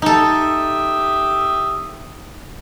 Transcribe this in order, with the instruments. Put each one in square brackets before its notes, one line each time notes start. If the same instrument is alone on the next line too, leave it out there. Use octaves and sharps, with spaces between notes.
[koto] D#4 A4 [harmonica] G4 E5 D#6